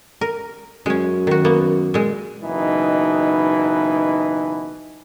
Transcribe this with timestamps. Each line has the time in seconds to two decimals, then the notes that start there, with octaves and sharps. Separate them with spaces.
0.21 A#4
0.86 F#2 G#3 C#4
1.27 D#3 F#4
1.45 A#3 B3
1.94 A#2 G#3
2.43 F#1 B2 E3 D#4